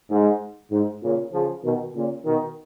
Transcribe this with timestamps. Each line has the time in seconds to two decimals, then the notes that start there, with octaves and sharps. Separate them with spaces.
0.10 G#2
0.72 G#2
1.03 A#2 C#3
1.33 C#3 F3
1.64 B2 D#3
1.95 A#2 C#3
2.26 B2 D#3